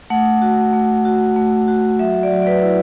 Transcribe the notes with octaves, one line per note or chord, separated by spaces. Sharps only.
A3 F#5
F#4
A3
F#4
A3
F#4
F#3 E5
D5
F#3
D5
B4
E4